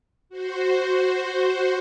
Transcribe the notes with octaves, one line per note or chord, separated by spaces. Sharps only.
F#4 C5